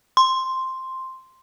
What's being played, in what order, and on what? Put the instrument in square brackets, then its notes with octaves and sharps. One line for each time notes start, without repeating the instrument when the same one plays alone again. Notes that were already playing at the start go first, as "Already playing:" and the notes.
[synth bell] C6